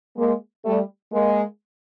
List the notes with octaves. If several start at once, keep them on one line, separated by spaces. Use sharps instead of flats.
G#3 A#3
G3 A3
G#3 A#3